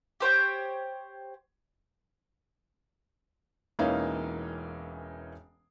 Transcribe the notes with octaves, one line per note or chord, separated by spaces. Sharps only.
G4 C5 C#5 G5
E1 E3 A#3 C#4 D#4 F5